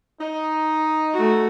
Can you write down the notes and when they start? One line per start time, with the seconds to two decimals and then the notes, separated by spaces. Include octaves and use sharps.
0.20 D#4
1.14 A3 F#4